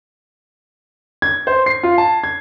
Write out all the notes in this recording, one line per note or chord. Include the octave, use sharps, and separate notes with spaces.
G#6
C5
C7
F4
A5
G#6